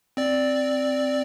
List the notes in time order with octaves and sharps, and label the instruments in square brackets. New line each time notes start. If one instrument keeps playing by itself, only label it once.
[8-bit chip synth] C4 D5